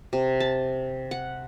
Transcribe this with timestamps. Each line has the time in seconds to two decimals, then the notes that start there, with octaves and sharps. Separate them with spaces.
0.13 C3
0.40 A5
1.11 F#5